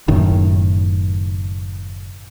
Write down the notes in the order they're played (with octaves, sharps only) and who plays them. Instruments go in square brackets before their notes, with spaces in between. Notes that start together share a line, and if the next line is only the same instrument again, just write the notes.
[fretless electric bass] F#1 F#2 A2 D#3